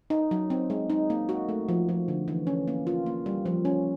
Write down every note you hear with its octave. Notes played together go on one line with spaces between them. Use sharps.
D#4
F#3
C4
G#3
D#4
A#3
F#4
A3
F3
F3
D3
E3
C#4
A#3
F4
A#3
G3
F3
C#4